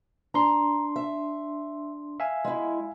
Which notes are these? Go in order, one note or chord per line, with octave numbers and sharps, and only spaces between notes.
D4 A#5 C6
E5
E5 F5 G#5
G#3 E4